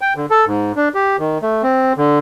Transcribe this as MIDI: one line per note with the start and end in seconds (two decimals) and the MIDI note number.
0.01 0.14 79
0.16 0.26 50
0.30 0.45 69
0.47 0.72 44
0.76 0.89 62
0.95 1.17 67
1.19 1.38 51
1.42 1.62 57
1.63 1.93 60
1.97 2.19 50